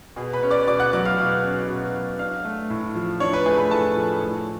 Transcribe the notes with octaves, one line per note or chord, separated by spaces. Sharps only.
B2 G#4 G#5
B4 B5
C#4
D5 D6
B2 D5 D6
F#5 F#6
F#3 D5 D6
F5 F6
B2
C#4
B2
F#3
D4 F5 F6
A3
A2
F3
D4 C#5 C#6
B4 B5
A3 G#4 G#5
B4 B5
A2 A4 A5
F3
A2